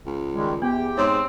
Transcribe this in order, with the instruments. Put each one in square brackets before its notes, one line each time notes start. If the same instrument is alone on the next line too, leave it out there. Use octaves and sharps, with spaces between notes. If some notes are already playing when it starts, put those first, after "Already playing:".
[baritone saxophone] C#2
[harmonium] D#3 G3 G#3
[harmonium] E2 G4 G5 [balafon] B3
[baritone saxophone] G#2 [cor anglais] C4 [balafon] C#5